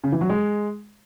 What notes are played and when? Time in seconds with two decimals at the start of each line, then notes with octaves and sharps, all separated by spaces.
0.04 C#3
0.12 E3
0.21 F#3
0.30 G#3